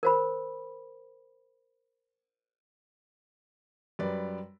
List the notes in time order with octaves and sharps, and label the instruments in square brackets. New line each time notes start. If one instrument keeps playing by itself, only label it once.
[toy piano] A#4 C5 B5
[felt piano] F#2 G3 B4 D5